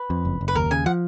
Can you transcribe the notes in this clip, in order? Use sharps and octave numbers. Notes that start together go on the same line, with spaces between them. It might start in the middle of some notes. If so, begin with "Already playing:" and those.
Already playing: B4
F2
F#1
F#1
B4
D#2 A#4
C#3 G#5
F3 F#5